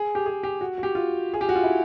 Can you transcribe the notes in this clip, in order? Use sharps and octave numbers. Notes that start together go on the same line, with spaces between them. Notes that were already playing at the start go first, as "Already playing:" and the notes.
Already playing: G#4
G4
G#4
G4
F#4
F#4
G4
F4
G#4
G4
F#4
F4
E4